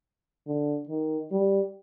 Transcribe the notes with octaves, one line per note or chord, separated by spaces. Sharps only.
D3
D#3
G3